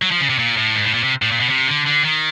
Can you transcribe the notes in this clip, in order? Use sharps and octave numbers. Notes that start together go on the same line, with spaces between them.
F#3
F3
C#3
C3
A#2
A2
G#2
A2
A#2
C3
A2
A#2
B2
C3
D3
D3
D#3